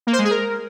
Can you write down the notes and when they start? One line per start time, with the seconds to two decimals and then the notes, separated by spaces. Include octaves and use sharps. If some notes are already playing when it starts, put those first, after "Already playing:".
0.07 A#3
0.13 C5
0.19 G#3
0.25 G#4
0.31 A#4